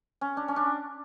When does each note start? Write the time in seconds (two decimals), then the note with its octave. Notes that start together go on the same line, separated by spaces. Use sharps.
0.21 C#4
0.37 D4
0.48 C#4
0.56 D4